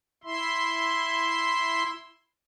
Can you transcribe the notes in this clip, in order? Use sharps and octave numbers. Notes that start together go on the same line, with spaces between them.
E4 E5 C6